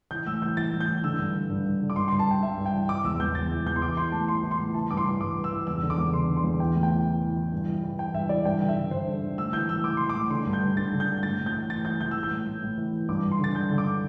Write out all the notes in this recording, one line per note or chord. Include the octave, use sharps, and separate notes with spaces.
E3 G6
A2 E6
E3 G6
E3 A6
A2
G6
E3
D3 E6
G2
G2
G2
G2
D3
D6
G2 C6
C6
G2
A5
G2 G5
G2 E5
G2
G5
E3
E3 D6
E2 E6
E2 G6
E2 A6
E3
E2 G6
C6
E3 D6
E3 C6
A2 A5
E3 C6
E3
C6
A2
E3 A5
G2 D6
C6
E3
G2 D6
E3
E6
E3
E2 E6
D3
D6
E2
D3 C6
D3
C6
E2
E3 G5
A2
G5
E3
E3
E3
E3
G2
E3
E3
E3 G5
G2 E5
E3 D5
G2 G5
D3
E5
D3
G2 C5
D3
D3
A2 E6
E3 G6
A2 E6
E3 D6
E3 C6
D6
A2
D3 C6
G2
G6
G2
G2 A6
D3
G6
G2
A2 A6
A2
G6
E3
A2 A6
E3 G6
E3 G6
E3 E6
G6
A2
A2
A2
E3
E3
G2 D6
G2
C6
D3 A6
G2 G6
D3
D6